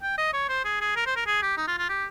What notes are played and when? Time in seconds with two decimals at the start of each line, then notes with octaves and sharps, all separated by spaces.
0.02 G5
0.18 D#5
0.33 C#5
0.49 C5
0.64 G#4
0.81 G#4
0.96 A#4
1.06 C5
1.16 A#4
1.26 G#4
1.42 G4
1.57 D#4
1.68 F4
1.78 F4
1.89 G4